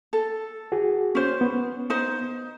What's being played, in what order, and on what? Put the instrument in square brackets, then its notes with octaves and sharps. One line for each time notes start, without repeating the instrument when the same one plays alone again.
[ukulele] A4
[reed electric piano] F#4 G#4
[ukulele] C#4 C5
[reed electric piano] B3
[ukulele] D#4 C5